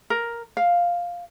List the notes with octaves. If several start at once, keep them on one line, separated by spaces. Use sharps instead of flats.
A#4
F5